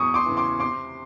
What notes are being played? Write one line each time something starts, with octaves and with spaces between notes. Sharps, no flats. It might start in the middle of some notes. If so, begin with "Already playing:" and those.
Already playing: E2 C#6 D#6
C6 D6
C#3 E3
C6 D6
C3 C6 D6